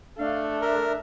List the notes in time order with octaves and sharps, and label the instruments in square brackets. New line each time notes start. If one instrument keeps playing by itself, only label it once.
[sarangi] A3 [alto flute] D4 [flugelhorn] F5
[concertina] A#4 [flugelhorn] E5